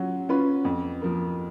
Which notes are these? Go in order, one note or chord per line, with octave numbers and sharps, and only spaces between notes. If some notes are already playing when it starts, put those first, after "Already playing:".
Already playing: F#3 C#4 F4
C#4 F4 B4
F2
F3 A#3